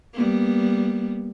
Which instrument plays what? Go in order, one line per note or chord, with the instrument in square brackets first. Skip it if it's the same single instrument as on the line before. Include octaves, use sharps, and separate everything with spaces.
[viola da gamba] G3 A#3 B3